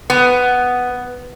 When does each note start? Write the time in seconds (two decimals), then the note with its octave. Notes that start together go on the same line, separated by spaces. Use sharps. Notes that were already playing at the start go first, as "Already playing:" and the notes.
0.10 B3